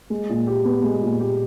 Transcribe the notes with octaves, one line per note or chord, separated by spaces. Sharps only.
G#3
A#2
G4
B3
G#3
A#2
G4